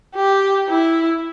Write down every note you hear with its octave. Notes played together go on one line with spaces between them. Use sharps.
G4
E4